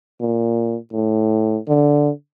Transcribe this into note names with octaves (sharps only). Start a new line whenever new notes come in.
A#2
A2
D3